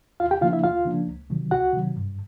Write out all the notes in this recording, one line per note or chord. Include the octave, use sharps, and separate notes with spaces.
D#2 F4 F5
G4 G5
C#3 F3 A#3 D4 F4 F5
E4 E5
D#2 F4 F5
C#3 F3 A#3 D4
C#2
C3 D#3 F#3
C#2 F#4 F#5
C3 D#3 F#3
G2